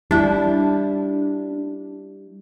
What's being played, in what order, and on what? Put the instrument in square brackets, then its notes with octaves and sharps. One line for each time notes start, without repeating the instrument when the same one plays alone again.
[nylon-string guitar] G3 E4 [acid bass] D4